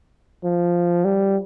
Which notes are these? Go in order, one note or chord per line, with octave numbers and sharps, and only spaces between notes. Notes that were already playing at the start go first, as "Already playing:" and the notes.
F3
G3